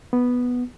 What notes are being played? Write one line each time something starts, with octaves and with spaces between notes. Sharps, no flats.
B3